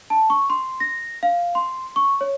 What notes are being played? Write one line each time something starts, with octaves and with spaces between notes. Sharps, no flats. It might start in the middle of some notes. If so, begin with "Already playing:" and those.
A5
C#6
C6
A#6
F5
C6
C#6
C#5